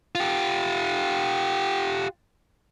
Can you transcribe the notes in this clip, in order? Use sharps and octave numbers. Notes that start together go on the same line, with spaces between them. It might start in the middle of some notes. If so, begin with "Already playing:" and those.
F4 G4